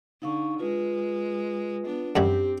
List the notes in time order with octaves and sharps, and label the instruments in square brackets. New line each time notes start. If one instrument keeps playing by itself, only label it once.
[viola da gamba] D3 [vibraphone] D#4 F5 C#6
[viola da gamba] G#3 [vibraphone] F4 B4
[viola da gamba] B3 D4
[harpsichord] F#2 F#3 G3 [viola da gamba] C4 [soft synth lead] G4